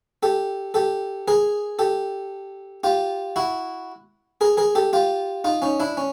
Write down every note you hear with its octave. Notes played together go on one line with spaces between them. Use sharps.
G4 A4
G4 A4
G#4 A#4
G4 A4
F4 G4
E4 F#4
G#4 A#4
G#4 A#4
G4 A4
F4 G4
D#4 F4
C#4 D#4
D4 E4
C#4